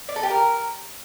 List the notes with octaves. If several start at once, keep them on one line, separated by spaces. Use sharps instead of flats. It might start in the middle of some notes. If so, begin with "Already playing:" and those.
D5
A4
G4
A#4